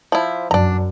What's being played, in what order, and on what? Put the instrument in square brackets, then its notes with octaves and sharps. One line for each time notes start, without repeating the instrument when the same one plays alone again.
[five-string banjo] F3 E4
[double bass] F#2 [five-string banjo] D4 A#5